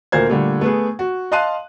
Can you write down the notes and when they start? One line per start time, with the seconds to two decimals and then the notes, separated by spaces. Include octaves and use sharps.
0.12 D2 A#2 A#4 C5 G#6
0.29 A#2 D3 G3 A3
0.61 A3 B3 G#4
0.99 F#4
1.32 D#5 F5 A5 C6 F#6 D#7